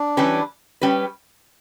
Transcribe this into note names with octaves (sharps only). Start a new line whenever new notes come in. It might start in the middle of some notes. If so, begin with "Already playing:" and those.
Already playing: D4
E3 G3 C#4 G4 B4
G3 C#4 G4 B4